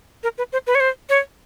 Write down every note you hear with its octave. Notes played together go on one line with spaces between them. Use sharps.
A#4
B4
C5
B4
C#5
C5
C#5